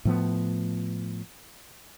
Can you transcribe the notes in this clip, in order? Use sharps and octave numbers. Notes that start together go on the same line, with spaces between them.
A2 F3 B3